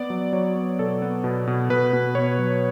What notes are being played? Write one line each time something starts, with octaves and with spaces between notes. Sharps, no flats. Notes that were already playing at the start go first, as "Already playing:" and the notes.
Already playing: B3 D5
F#3
F#3 C#5
B3
B2 A4
B3
B2
B2
B2 B4
B2
B2 C#5
F#3